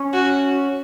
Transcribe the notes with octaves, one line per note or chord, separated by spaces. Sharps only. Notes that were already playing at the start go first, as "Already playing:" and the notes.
Already playing: C#4
F#4